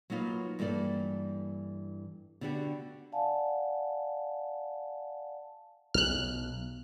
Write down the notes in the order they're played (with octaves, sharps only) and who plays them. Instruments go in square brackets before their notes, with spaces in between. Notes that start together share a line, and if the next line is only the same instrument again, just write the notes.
[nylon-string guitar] F#3 A#3 D#4 F4 B4
G2 E3 A#3 A4 D5
D3 B3 D4 F#4 G4
[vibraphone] D5 F5 F#5 G#5 A5
[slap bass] B1 [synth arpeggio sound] F6 F#6